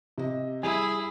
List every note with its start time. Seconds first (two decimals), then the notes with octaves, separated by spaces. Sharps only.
0.18 C3 D#5
0.63 G3 E4 G#4 G#5